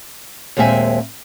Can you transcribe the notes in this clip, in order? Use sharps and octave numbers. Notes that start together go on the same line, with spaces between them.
D#2 A#2 G#3 C4 E5 G#5